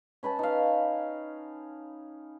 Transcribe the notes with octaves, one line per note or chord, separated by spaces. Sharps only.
C#4 B4 G5 A5
D#4 F5